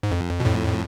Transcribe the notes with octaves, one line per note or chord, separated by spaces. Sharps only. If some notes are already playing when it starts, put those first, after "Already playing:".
G#2
F2
B2
F2 A2